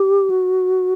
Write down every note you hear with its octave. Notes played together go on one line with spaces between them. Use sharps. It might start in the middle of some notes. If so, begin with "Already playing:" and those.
Already playing: G4
F#4